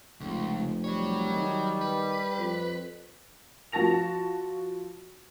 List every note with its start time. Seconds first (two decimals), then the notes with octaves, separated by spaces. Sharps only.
0.20 F1 C#2
0.84 F#3 G3 C#5
1.32 D#3
1.81 B4
2.38 F2
3.72 F3 F#4 A5 A#6 F7